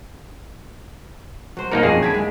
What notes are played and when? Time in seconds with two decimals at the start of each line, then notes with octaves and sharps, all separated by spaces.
1.57 F#3 C5
1.71 B2 A#3 D#4 A#4 D5 C#7
1.83 F2 D#3 A#3 C#4 G#4 A#6
2.02 D3 E4 G#6 B6 D7
2.14 G#3